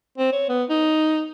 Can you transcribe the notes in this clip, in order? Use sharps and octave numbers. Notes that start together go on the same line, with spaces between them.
C4
C#5
B3
D#4